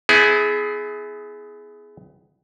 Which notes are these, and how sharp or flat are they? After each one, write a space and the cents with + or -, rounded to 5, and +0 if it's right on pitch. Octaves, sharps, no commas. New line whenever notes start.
B3 +25 E4 -15 G#4 +15